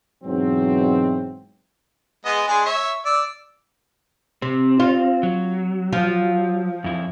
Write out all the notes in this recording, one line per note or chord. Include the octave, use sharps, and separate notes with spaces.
G#2 B2 E3 F#3 C4
G#3 B3 D#5
G#3 D4 G#4
C#5 E5
D5 E6
C3 C4
F4
F#3
F3
F2 E4